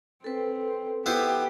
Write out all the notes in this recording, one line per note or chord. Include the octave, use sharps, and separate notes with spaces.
C4 A4 B4
B3 E4 G4 C5